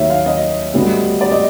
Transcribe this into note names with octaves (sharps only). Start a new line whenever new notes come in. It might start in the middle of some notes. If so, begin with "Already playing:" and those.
Already playing: D#2 D#3 F#3 C#5 E5
F5
D#5
D2 D3 G3 B3
D5
D#5